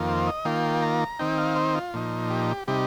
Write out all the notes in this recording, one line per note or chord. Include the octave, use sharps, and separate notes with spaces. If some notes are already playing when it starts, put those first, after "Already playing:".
Already playing: F2 D#3 A#3 F4
C5
D#5
D#3 A#3 F4 G5
A#5
D#3 C4 D#4 G5
F5
C5
F4
A#2 F3 D#4
G4
C3 G3 D#4 G4